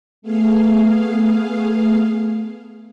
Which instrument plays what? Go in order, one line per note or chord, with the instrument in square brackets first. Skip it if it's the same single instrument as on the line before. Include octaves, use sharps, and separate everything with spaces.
[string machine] A3 B3 G#4 F5